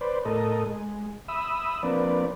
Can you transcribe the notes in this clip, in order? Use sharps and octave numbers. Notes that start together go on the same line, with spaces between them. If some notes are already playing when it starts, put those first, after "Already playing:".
B4 C5 D5
A2 A4 A#4 D#5
G#3
E5 B5 D#6 E6
F3 A#3 C4 D4 B4 D5